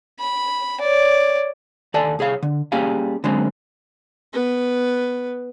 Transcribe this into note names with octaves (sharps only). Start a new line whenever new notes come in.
B5
C#5 D5
D#2 A4 D5 G#5 A5
C2 G#4 C#5 F5
D3
G3 A#3 C#4 G4 G#4 F5
D3 F#3 G#3 A#3 C4 C#4
B3 B4